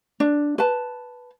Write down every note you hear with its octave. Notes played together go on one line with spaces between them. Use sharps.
D4
B4 A5